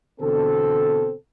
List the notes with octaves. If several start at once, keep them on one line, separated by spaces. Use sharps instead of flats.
E2 B2 D3 C4 A4